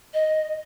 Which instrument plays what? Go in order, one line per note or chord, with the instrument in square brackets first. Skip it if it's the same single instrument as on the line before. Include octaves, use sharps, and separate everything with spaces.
[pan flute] D#5